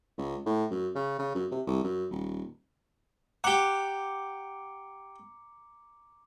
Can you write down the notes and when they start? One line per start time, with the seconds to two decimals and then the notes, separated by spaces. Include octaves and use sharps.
0.18 C#2
0.46 A2
0.71 F#2
0.95 C#3
1.19 C#3
1.35 F#2
1.51 C3
1.67 C2
1.84 F#2
2.11 D#1
3.44 G4 F#5 A#5 D6 C#7